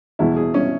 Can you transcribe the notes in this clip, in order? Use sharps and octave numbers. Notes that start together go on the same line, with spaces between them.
E2 B2 G#3 E4
G#4
C#4